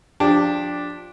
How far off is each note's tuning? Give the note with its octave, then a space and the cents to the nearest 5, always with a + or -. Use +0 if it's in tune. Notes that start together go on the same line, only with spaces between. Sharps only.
F3 +20 D4 +0 G4 +15